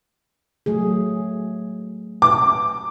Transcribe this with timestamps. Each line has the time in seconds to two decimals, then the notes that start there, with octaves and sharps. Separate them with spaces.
0.66 F#3 A3 G#4
2.22 D6